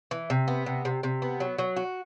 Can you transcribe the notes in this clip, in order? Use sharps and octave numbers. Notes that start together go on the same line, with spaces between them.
E3
C3
B3
C3
C3
C3
B3
F#3
F#3
F#4